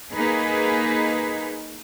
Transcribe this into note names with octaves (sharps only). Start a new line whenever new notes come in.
A#3 D#4 G#4 B4